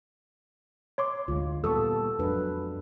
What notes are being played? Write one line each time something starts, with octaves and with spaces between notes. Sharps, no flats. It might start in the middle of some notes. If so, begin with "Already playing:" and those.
C#5 C6 D6
D2 G#3 F4
A#2 G3 B3 A4 C#6 D#6 E6
F2 F#3 G#3 D4 B4